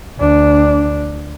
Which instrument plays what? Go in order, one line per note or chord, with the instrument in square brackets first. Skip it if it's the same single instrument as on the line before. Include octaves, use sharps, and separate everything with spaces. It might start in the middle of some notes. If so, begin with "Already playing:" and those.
[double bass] D2 D4